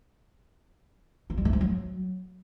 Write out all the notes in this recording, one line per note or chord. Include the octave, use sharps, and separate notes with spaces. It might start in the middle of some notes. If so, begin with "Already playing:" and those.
A#3
G3
A3
F3
F#3